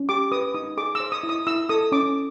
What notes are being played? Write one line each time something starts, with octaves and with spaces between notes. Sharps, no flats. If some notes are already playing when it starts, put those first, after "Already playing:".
Already playing: C#4
G4 D6
B4 D#6
D#4 D#6
G#4 D6
E6
C5
D#6
E4
D#6
E4 E6
A4 D#6
C#4 D6